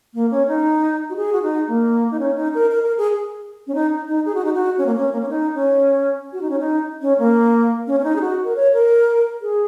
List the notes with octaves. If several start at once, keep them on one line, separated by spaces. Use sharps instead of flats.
A#3
C#4
D#4
F#4
G#4
F#4
D#4
A#3
D#4
C#4
D#4
A#4
A#4
A#4
G#4
C#4
D#4
D#4
G#4
F#4
D#4
F#4
C#4
A#3
C#4
A#3
C#4
D#4
C#4
F#4
D#4
C#4
D#4
C#4
A#3
C#4
C#4
D#4
G#4
F#4
A#4
C#5
A#4
G#4